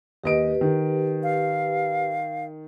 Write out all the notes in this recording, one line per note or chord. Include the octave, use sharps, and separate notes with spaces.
D#2 G4 B4 D#5 D7
D#3
F5